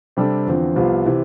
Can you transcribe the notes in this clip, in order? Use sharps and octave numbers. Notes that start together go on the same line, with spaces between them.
C3 G3 D4 A4
E2 D3 F3 C4
C2 C3 F3 B3 F4
C3 E3